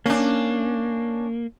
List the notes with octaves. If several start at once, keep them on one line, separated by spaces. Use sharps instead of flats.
A#3 C#4 D4